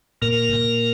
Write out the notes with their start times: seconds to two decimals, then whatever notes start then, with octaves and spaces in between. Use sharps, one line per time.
0.22 A#2 A#3 A#4
0.53 A#2